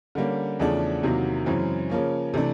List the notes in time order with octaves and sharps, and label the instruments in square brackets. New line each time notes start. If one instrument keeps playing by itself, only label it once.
[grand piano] D3 G3 A#3 C#4
E2 C#3 F3 A3 D4
E2 C3 D#3 F#3 A#3
F#2 C#3 E3 G#3 C4
C#3 F3 A#3 C#4
C3 E3 A3 D4